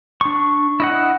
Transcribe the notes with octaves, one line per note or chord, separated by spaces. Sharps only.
D4 C#6
E4 D#5 F#5